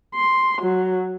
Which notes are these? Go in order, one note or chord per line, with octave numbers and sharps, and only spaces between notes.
C6
F#3